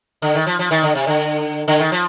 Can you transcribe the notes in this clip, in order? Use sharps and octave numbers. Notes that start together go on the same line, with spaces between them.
D3
D#3
F3
F3
D#3
D3
C3
D3
D3
D#3
F3